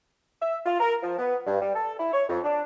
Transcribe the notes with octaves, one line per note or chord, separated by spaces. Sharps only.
E5
F4
A#4
F3
B3
G2
G3
A4
E4
C#5
F2
D4